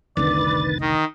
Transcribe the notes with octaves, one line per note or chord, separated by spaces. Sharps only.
F1 C2 D3 D#3 B4 D5 A6
D#3 D#5